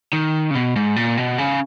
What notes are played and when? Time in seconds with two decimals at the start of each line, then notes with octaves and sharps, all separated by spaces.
0.13 D#3
0.51 C#3
0.55 B2
0.76 G#2
0.96 A#2
1.17 B2
1.38 C#3